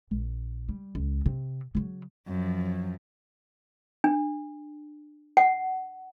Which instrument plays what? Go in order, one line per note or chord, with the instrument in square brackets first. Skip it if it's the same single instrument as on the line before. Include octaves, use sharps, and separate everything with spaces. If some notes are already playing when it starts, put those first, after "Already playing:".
[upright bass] A#1
G3
C#2
C3
C#3 F#3
[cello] F#2 F3
[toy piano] D4
F#5